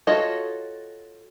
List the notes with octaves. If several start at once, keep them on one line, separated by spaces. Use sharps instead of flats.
F4 F#4 A4 C#5 D#5